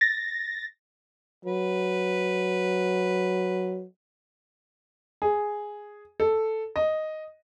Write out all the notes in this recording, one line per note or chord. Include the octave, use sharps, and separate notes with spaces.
A6 A#6
F#3 B4
G#4
A4
D#5